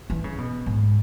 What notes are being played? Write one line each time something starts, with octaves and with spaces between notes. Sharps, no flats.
E3
C#3
B2
G#2